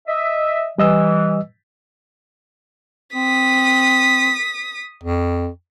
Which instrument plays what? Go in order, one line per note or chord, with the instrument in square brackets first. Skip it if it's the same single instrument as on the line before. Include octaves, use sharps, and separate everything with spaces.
[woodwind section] D#5 E5
[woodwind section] E3 [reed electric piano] G3 D#5 E6
[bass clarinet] C4 [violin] D#6 B6
[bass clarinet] F2